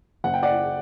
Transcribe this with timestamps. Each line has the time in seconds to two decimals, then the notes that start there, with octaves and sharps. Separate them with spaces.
0.24 F#1 F#5
0.34 G5
0.43 D5 F#5